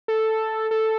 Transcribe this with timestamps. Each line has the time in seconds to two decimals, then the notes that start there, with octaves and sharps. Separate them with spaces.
0.08 A4
0.71 A4